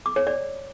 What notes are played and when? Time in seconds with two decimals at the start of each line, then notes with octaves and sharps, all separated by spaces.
0.06 D6
0.16 C#5
0.27 D5